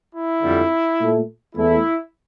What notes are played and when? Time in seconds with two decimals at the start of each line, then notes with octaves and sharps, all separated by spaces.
0.12 E4
0.41 F2 D3 G3
0.99 A#2 A3
1.55 E2 E3 A3 E4